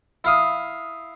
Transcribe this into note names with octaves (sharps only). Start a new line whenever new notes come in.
E4 F5 D#6